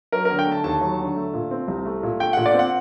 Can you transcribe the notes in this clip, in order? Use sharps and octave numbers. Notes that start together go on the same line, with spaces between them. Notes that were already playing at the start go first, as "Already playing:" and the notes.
F#3 A#4
D3 A#4
G5
A3
A5
D#2 A5
F#3
D3
A3
A#2
C4
C2
A3
A#2
A3 G5
A#2 F#5
D5
C4 F#5